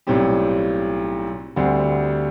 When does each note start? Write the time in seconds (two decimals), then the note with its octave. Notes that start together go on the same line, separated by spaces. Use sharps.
0.07 B1 A2 G3 C4 G4
1.56 D2 D3 G3 C4